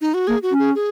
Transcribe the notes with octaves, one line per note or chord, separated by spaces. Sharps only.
D#4
F#4
A#3 G#4
F#4
C#4
G#4
G#4